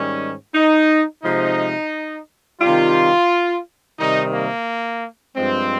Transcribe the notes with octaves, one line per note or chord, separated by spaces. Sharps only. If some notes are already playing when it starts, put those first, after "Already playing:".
Already playing: G#2 D#3 G3 C#4
D#4
C3 F3 G#3 D#4
C3 D#3 G3 F4
C3 D#3 G3 D#4
A#3
G2 F3 G#3 C4